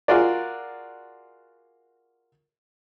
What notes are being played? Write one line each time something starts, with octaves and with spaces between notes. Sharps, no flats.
F4 F#4 G#4 A#4 D5